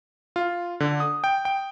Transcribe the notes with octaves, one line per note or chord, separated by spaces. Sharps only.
F4
D3
D#6
G5
G5